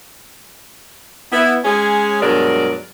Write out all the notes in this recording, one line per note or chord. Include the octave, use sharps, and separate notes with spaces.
B3 E4
G#3 C#4 G#4
G2 B2 F#3 G#3 A#4 D5